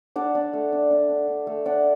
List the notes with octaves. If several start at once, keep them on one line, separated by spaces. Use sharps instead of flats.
D4 D5 F#5
D4
A3
D4
D4
D4
D4
A3
D4 D5 F#5